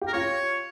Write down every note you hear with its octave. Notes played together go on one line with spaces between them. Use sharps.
G4
A#4
F4 C#5